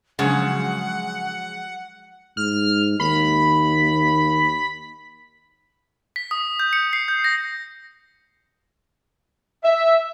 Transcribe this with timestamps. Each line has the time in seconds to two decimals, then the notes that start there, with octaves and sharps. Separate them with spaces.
0.19 C#3 F3 F#3 G#3 F#5
2.37 G#2 F6
3.00 D#2 B5
6.16 B6
6.31 D#6
6.60 G6
6.73 C#7
6.93 C7
7.08 G6
7.24 A#6
9.64 E5